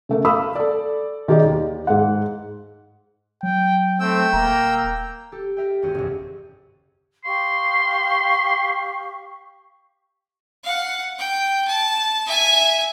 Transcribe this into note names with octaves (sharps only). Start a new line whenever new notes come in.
C#3 A3 A#4
F5 B5 D#6 E6
A4 D5
D#3 D#4 G4 G#4 D5 D#5
D#2
G#2 F#5
F#3 G5
A3 C4 G5 E6
D#1 A#3 A#5
G4 A4
A#4 E5 G5
G#1 E2 C#4 F#4 C5 D#7
F#1 C2 F#2
G4 F5 C6 C#6
F5 F#5
G5
A5
E5 G#5